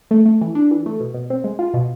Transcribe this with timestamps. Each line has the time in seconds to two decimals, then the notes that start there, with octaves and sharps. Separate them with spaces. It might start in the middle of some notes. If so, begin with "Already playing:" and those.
0.11 A3
0.26 A3
0.41 E3
0.55 D4
0.71 E3
0.86 A3
1.00 B2
1.14 B2
1.30 C4
1.44 G#3
1.59 F4
1.74 B2